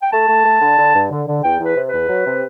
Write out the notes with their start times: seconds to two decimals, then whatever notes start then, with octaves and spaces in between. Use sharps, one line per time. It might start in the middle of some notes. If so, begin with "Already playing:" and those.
0.03 G5
0.13 A3 A5
0.29 A3
0.46 A3
0.61 D3
0.78 D3
0.94 G2
1.11 D3
1.27 D3
1.44 E2 G5
1.59 E2
1.65 B4
1.76 C3
1.88 B4
1.93 E2
2.09 F#3
2.26 C3